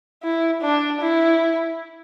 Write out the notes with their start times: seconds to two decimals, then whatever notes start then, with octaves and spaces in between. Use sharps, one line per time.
0.23 E4
0.62 D4
1.00 E4